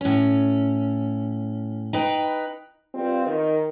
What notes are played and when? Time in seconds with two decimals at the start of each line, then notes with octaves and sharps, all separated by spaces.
0.01 A2 C#4
1.93 D#4 B4 G5
2.94 G3 B3 C4 F4
3.27 D#3